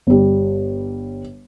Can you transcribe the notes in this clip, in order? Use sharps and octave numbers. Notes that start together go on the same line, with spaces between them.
G1 G3